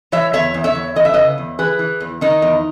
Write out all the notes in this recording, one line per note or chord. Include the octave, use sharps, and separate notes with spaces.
E3 C#5 E5
E2 C#5 E5
E2
C#5 E5
E2
E3 D#5
E5
C#3 B4 D#5
E2
E3 G#4 B4
E3
E2
D#3 D#4
E2